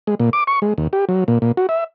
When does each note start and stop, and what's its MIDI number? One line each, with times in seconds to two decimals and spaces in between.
0.07 0.15 56
0.20 0.30 46
0.33 0.44 86
0.47 0.59 85
0.62 0.74 56
0.78 0.88 39
0.93 1.05 67
1.09 1.24 54
1.28 1.38 46
1.42 1.52 46
1.57 1.67 66
1.69 1.84 76